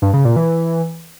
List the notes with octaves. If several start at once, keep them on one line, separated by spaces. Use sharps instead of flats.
G2
C#3
A#2
E3